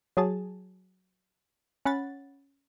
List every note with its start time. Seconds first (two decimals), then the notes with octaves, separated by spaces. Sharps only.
0.17 F#3 G#4 A5
1.85 C#4 F#5 B5 A6